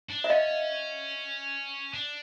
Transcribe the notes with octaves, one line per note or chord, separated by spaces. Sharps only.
D4
E5
C#4 D#5 F5
D4